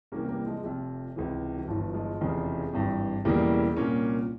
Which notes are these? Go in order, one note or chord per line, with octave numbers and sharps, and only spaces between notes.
C2 C3 E3 A#3 C#4
G3 A#3
F3 G#3
F1 F2 C3 F3
C#2 C3 E3
E3
G1 G2 E3 F3
F3 G#3
F1 E2 C#3
G#1 G2 E3
E1 E2 C#3 E3 G3 A#3
C2 A#2 A#3 C#4